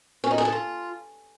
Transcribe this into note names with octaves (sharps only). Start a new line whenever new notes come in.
C#4
D#4
G#4
A4
F4